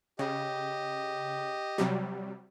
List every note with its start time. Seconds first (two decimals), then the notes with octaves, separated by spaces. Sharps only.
0.19 C#3 G4 D#5
1.78 C3 F#3 G3